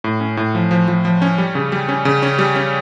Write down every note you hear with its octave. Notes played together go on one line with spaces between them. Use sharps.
A2
C#4
A2
F3
F3
F3
F3
C#4
G3
C#3
G3
C#4
C#3
C#4
G3
C#4